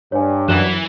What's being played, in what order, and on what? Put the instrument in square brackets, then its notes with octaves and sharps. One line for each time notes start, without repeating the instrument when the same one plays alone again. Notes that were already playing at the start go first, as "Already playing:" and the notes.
[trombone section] G2 [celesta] C#5 G#5
[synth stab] F#2 [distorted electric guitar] E3 [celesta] F#6 E7